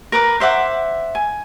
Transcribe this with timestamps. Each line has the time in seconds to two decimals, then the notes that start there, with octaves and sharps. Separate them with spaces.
0.12 A#4 B4 D6
0.40 C5 E5 F#5 D6
1.15 G#5